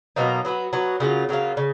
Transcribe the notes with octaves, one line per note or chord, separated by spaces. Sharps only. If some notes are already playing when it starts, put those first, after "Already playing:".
B2 F#3 A#3 D#4
F#3 B3 F#4
F#3 B3 F#4
C#3 F#3 A#3 F4
C#3 F#3 A#3 F4
C#3